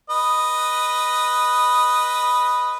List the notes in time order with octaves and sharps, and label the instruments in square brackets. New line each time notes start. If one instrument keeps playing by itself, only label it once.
[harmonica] B4 D#5